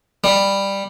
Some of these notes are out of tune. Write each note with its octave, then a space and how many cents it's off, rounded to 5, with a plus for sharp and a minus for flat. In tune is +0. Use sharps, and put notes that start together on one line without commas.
G3 +10